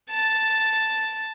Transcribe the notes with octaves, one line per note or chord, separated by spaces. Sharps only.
A5 A6